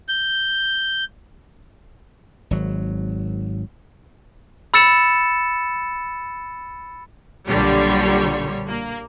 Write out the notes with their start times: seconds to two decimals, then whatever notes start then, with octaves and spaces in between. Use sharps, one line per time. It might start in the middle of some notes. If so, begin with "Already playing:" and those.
0.08 G6
2.51 G#1 F#3
4.74 B5 E6 A6 C#7 E7
7.48 B1 A#2 D3 G3 C#5
8.70 A#3